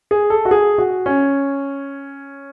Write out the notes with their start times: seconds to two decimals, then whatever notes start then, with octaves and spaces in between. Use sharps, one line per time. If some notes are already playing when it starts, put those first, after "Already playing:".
0.11 G#4
0.30 A4
0.45 F#4
0.51 G#4
0.78 F#4
1.06 C#4